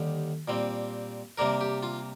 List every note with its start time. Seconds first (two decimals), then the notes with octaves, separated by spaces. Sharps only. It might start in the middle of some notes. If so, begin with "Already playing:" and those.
Already playing: D#2 D3 G3
0.48 A#2 G3 C4
1.38 C3 G3 A#3 D4 A#4
1.61 G4
1.83 F4